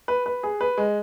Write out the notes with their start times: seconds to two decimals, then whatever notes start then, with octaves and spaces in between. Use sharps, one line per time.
0.08 B4
0.26 B4
0.43 G#4
0.61 B4
0.77 G#3